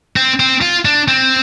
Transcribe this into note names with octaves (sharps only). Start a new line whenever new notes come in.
C4
C4
F4
D4
C4